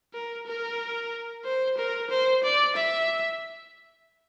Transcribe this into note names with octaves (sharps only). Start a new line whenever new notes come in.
A#4
A#4
C5
A#4
C5
D5
E5